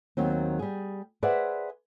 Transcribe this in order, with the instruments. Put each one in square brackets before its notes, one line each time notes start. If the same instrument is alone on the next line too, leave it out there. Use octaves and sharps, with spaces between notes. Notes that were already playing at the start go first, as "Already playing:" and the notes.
[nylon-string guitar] D#2 D#3 F#3 C4
G3 G#4
G#4 B4 C5 D5 E5 F#5